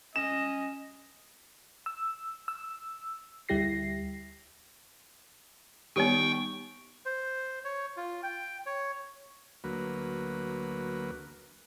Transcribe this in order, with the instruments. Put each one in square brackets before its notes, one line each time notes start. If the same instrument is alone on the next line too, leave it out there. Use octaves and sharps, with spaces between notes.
[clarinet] C#4 [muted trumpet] D#5 [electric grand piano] E7
[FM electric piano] E6
E6
D2 G3 E4 G4 A#6 C7
[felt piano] D#3 G3 C#5 [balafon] B3 G4 [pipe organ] G5 C#6
[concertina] C5
C#5
F4
G5
C#5
[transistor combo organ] D2 F#3 A#3 B4